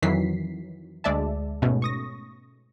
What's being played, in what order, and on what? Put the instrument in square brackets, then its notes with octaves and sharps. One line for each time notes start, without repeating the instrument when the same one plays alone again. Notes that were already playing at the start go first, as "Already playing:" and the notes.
[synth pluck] F2 D#3 E3 F#3 B6 C7
D2 G#3 D5 E5 A5
G#2 B2 A3 C#4
C#6 D#6 A#6